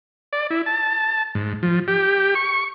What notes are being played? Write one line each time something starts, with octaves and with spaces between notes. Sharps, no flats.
D5
E4
A5
G#2
F3
G4
C#6